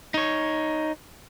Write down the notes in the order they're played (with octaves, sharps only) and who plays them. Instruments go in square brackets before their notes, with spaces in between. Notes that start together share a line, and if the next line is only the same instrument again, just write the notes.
[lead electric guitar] D#4 C#5